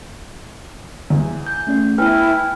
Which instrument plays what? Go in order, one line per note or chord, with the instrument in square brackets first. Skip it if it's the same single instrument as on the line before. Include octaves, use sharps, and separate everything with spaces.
[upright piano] E2
[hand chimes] G6
[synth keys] A3 C#4 D5
[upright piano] B3 B4 [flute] E4 [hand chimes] G5 F6 [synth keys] G#5 E6